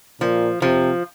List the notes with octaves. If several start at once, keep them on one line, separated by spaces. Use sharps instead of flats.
A#2 F3
C3 F3